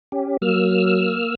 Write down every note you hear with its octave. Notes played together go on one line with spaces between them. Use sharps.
C#4 G4
F#3 A#3 E6 F6